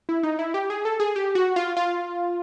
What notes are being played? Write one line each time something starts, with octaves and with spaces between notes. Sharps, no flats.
E4
D#4
E4
G4
G#4
A4
G#4
G4
F#4
F4
F4